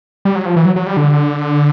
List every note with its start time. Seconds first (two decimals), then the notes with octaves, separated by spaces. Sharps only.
0.25 G3
0.35 F#3
0.46 F3
0.56 E3
0.65 F#3
0.76 F#3
0.86 G3
0.97 D3